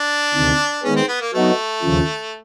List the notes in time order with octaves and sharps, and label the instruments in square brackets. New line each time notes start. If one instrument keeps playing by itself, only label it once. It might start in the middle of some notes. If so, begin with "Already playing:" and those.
Already playing: [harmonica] D4
[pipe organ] D2 C3 D#3
[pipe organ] D#3 G#3 B3 [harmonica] C#4
[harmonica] C4
B3
A#3
[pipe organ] F#3 B3 D#4 F#4 [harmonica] A3
[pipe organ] D#2 C#3 F3